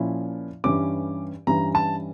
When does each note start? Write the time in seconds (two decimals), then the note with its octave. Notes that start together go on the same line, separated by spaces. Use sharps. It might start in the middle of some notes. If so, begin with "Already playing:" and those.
Already playing: A#2 F3 C#4 E4
0.64 G2 E3 G3 C#4 D6
1.47 G2 E3 G3 C#4 A#5
1.75 A5